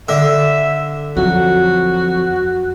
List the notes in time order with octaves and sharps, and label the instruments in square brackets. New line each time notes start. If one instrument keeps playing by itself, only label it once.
[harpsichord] D3 [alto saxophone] E5
[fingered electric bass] F2 F#3 [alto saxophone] F#4